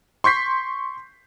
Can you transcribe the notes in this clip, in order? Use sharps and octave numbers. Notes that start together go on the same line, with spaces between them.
C6 C#6 G6 B6 C7